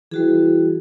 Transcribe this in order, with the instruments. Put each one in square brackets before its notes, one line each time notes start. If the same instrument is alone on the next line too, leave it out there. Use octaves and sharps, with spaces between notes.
[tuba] E3 [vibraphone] G3 F#4 G#4